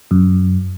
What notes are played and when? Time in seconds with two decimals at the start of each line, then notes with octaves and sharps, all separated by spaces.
0.11 F#2